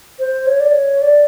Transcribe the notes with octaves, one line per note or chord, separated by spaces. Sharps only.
C5
C#5
D5
C#5
D5